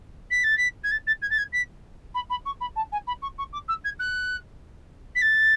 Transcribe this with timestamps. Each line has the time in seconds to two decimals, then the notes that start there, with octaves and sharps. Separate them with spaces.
0.30 B6
0.44 A6
0.57 B6
0.84 G#6
0.91 A6
1.07 A6
1.22 G#6
1.30 A6
1.38 G#6
1.52 B6
2.14 B5
2.30 B5
2.45 C#6
2.61 B5
2.76 A5
2.92 G#5
3.07 B5
3.22 C#6
3.38 C#6
3.53 D6
3.68 E6
3.84 G#6
3.99 F#6
5.15 B6
5.22 A6